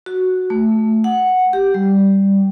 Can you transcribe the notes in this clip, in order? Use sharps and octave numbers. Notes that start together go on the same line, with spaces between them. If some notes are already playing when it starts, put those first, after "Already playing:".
F#4
A3
F#5
G4
G3